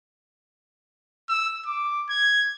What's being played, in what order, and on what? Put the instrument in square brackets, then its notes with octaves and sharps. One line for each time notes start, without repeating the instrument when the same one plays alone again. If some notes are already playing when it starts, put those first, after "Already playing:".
[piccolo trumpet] E6
D6
G#6